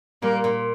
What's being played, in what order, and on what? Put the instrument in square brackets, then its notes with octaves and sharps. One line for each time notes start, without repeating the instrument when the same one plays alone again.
[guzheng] A#2 [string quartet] G3 A#3
[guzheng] A#2